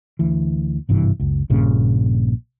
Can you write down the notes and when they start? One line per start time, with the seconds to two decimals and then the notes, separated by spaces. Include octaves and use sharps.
0.19 D2 E3
0.89 G#1 G2 C3 E3
1.20 F#1 C#2
1.50 A#1 G2 A#2 C#3